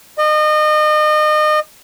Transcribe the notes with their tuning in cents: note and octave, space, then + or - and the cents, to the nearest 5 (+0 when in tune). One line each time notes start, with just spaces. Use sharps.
D#5 -30